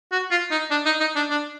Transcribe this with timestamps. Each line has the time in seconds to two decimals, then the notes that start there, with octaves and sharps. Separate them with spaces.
0.12 F#4
0.31 F4
0.51 D#4
0.71 D4
0.86 D#4
1.00 D#4
1.16 D4
1.30 D4